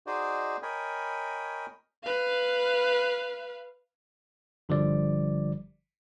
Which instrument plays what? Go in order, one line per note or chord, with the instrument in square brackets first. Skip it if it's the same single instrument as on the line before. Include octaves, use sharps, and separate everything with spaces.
[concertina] D#4 F#4 G#4 C5 D5 D#5
A#4 C#5 D#5 G5 G#5 B5
[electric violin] B4 F5
[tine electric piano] G1 D3 F3 G3 D5